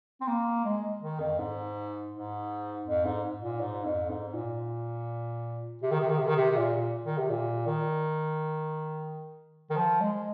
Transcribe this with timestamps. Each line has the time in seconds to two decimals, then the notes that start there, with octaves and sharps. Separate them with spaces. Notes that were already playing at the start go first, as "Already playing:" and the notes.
0.21 C4
0.28 A#3
0.65 G#3
1.01 D#3
1.20 F2
1.39 G#2
2.13 G#2
2.86 F2
3.05 G#2
3.42 A#2
3.61 G#2
3.85 F2
4.09 G#2
4.34 A#2
5.83 C3
5.92 D#3
6.00 C3
6.09 D#3
6.18 C3
6.28 D#3
6.36 C3
6.52 C3
6.57 A#2
7.06 D#3
7.18 C3
7.30 A#2
7.67 D#3
9.70 D#3
9.77 F3
10.00 G#3